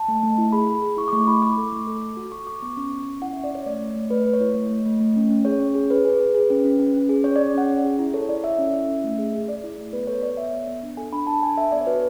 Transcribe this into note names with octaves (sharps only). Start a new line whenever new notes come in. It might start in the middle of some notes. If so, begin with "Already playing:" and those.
Already playing: A5
A3
A3
E4
G#4 B5
G#4
G#4
E4 C#6
D6
A3 C#6
E4 B5
E4 D6
A4
A3
A4
A4
F#4
F#4 C#6
F#4 D6
B3 C#6
C#4
C#4
C#4
E4 F#5
C#4 E5
D5
C#4 C#5
A3 D5
A3
A3
A3 B4
A3
C#5
E4
A3
A3
A3
A3
C#4
C#4
G#4 C#5
C#4
G#4
G#4 B4
G#4
G#4
G#4
C#4
C#4
C#4
C#4
G#4
C#4 C#5
G#4 D5
C#4 F#5
C#4
G#4
E4
A4 C#5
E4 D5
A4 E5
C#4
E4
C#4
A3
G#4
G#4
G#4 D5
E4
A3
B3 B4
A4 C#5
A4 D5
B3 E5
B3
B3
D4
A4 G#5
D4 B5
D4 A5
A4 G#5
A4 E5
B3 D5
C#5
F#4 B4